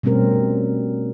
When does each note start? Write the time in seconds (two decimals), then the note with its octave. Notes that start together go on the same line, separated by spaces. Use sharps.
0.03 B2 G3 A3 C4 C#4 A#4